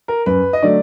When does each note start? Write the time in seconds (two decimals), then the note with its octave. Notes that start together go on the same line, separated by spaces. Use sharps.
0.08 A#4
0.26 F#2 B4
0.53 D#5
0.62 D3 F#3 A3 D5